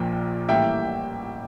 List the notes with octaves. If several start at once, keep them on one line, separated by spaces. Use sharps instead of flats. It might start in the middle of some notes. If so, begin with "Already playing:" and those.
Already playing: A#1 A#2 F3 A#3 G5
A1 A2 G3 A#3 E5 G5